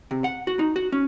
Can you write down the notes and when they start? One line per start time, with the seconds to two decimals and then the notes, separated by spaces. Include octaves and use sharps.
0.11 C3
0.24 F#5
0.47 F#4
0.59 D#4
0.76 F#4
0.92 C#4